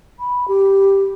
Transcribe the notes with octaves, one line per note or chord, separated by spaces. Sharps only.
B5
G4